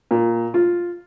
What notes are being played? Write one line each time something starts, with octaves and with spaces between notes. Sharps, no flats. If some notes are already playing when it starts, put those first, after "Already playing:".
A#2
F4